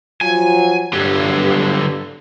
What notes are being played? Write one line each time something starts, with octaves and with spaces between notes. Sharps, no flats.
F3 F#3 F4 G#5
G2 D3 F#3 G4